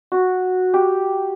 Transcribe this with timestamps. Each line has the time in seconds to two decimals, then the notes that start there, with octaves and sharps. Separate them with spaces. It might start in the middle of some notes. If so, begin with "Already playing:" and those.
0.12 F#4
0.74 G4